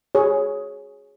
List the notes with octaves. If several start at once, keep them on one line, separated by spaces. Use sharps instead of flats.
G#4 C#5